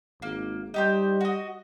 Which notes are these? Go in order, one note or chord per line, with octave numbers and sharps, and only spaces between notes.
G#1 A#3
G3 D#4 G4 C5
F#4 D#5